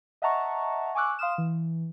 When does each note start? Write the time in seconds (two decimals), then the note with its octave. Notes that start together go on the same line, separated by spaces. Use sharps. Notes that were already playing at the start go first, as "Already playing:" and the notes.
0.22 D#5 E5 F#5 A5 A#5 C#6
0.95 G#5 C#6 D6 E6 F#6
1.19 F5 C6 D#6 F6 E7
1.38 E3